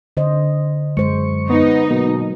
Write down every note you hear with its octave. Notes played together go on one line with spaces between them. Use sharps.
D3 C5 D#5
F#2 G#3 C5 C#6
B3 D#4
B2 F#3 A#3